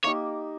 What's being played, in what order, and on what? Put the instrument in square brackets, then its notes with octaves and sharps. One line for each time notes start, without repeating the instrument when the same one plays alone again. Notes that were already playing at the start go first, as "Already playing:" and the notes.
[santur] A#3 D#4 G4 [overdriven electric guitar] C#5